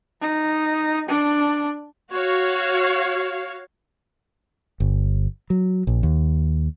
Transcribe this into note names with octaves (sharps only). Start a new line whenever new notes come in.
D#4
D4
F#4 C#5 F5
G1
F#3
A#1
D#2